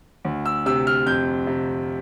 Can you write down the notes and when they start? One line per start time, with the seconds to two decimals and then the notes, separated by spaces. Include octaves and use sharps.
0.25 D2
0.45 E6
0.66 C3 E6
0.87 F6
1.06 F2 G6
1.47 C3